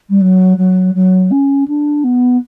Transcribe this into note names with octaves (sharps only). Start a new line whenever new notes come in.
G3
F#3
F#3
F#3
C#4
D4
B3